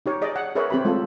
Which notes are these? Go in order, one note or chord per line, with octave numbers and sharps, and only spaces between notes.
D#4 G4 C#5
G#4 D5 D#5
F#5
G#4 A#4 B4 C#5 E5
C4 G4 B5
G#3 A3 F4 A4